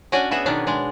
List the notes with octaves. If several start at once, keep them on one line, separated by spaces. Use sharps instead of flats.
C#4 D4 F#4 D5 G#5
B3 F#4 G#4 E5
B2 D#3 C#4 D4
G#3 D4